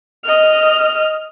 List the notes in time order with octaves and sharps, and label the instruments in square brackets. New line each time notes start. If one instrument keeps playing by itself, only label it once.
[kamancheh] D#5 F6